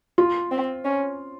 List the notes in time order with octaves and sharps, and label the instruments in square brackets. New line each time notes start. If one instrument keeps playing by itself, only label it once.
[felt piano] F4
[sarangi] C4
C#4